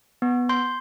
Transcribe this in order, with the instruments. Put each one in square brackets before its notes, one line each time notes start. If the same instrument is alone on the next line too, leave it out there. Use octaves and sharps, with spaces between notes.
[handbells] B3
C6 G6